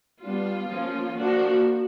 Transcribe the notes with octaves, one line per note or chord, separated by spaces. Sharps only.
G3 B3 D4 F4
F3 A#3 C#4
F3 A#3 D4 F#4